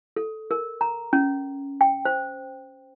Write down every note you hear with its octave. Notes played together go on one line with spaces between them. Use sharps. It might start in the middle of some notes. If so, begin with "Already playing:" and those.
A4
A#4
A#5
C#4
G5
C5